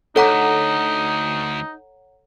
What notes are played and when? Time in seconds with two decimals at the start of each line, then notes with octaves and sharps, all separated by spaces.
0.16 D2 D#4 A4 C#5 F#5 A#5 D6